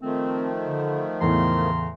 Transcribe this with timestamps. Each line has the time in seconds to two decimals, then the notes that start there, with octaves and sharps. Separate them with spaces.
0.02 D#3 F3 A3 C4
0.66 D3
1.21 E2 A2 C#3 A#5 C6